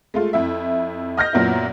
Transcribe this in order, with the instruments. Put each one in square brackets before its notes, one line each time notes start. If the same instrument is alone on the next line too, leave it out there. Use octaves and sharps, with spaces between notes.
[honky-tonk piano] G#3 A3 F4
F2 E4 E5
D#5 F6 G6 A#6
F#2 A#2 B3 E4